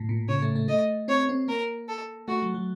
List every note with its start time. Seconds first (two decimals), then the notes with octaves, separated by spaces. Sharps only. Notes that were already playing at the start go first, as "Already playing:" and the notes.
Already playing: A2
0.09 A#2
0.28 C#3 C#5
0.42 A3
0.56 A3
0.68 A3 D#5
1.08 C4 C#5
1.29 C4
1.48 A#3 A#4
1.88 A4
2.28 A3 F#4
2.42 F#3
2.54 F#3